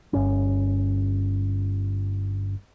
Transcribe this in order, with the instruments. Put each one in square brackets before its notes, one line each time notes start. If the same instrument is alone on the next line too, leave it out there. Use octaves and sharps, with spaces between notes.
[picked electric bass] G1 C#4